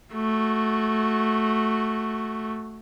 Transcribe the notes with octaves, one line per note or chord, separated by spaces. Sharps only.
A3 F#4